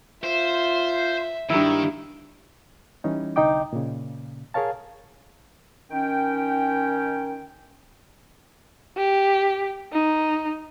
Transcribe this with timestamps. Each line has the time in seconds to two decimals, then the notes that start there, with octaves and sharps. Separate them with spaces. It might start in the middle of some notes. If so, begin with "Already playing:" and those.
0.24 F4 C5 E5
1.50 G2 D#3 A#3 E4
3.04 E3 G3 C#4 D#4
3.36 C2 D3 D#4 D#5 G5 D6
3.73 A#2 C#3
4.54 G#4 A#4 C#5 F5 A5
5.91 D#3 C#4 G5
8.97 G4
9.93 D#4